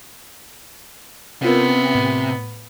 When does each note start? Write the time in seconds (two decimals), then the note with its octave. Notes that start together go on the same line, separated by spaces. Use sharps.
1.42 C3 B3 C#4 F4 A#4
1.95 A2